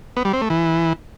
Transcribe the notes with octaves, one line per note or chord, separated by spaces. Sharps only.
B3
G3
C4
A3
E3